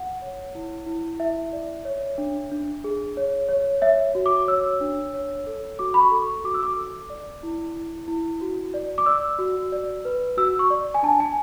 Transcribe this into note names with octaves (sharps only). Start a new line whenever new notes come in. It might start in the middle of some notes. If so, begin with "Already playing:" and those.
Already playing: F#5
C#5
E4
E4
E4 E5
D5
C#5
D4
D4
G#4
C#5
C#5
C#5 E5
F#4
D6
C#5 E6
D4
C#5
A4
F#4 D6
B5
C#6
A4
C#6
F#4 D6
E6
D6
A4
D5
E4
E4
E4
F#4
D5
D6
D5 E6
F#4
D5
B4
F#4 E6
C#6
D5
G#5
D4 A5
G#5